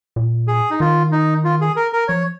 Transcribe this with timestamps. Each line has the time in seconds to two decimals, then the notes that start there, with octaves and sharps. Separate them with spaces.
0.16 A#2
0.48 G#4
0.70 D#4
0.80 D#3 F4
1.12 D#4
1.44 F4
1.61 G#4
1.76 A#4
1.93 A#4
2.08 F3 C#5